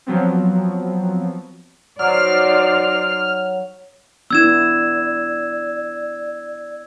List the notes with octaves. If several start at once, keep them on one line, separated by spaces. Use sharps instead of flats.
F3 F#3 B3 C4
F#3 D#4 C5 D5 F6
B3 D4 E4 D5 E6 G#6 E7